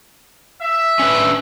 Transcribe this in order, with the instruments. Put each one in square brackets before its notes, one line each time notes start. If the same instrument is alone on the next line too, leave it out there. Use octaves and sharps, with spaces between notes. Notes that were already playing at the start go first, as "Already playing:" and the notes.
[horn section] E5
[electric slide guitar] C#4 D4 B4